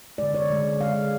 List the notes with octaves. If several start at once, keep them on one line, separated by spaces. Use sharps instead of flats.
D3 G#3 D5
C#5
D3 G#3
D3 G#3 F5